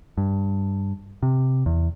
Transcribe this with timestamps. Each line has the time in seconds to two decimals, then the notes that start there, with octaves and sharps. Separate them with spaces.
0.18 G2
1.23 C3
1.66 E2